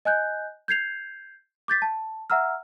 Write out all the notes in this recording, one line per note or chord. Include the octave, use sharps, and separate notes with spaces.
D#5 G#5 F#6 G6
G6 G#6 C7 F7
D6 G6 A6 B6
A5
E5 F#5 A#5 E6 F6